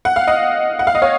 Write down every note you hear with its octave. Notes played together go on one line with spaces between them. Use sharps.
F#5
F5
D#5 F#5
F#5
F5
D#5
C#5 F5